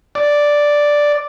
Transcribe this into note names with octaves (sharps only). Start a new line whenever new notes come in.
D5